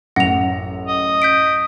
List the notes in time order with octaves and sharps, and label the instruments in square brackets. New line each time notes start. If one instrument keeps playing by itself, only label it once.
[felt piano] A1 F#2 A#6 [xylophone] F#5 F7
[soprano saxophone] D#5
[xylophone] G6 B6 D7